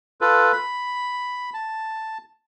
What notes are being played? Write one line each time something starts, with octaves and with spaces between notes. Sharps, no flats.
F4 A4 B4
B5
A5